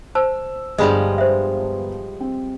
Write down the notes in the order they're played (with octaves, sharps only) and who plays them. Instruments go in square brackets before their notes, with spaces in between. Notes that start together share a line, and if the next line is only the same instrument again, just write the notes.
[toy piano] C5 A5 [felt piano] E6
[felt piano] G1 [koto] F3 G3 G#3 [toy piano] D#5 B5
[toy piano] C5 E5
[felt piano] C4